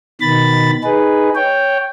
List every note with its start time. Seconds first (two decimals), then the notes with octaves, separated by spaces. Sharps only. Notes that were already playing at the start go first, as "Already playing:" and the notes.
0.21 B2 D#3 B5 A6
0.84 D#4 G#4 B4
1.35 C#5 G5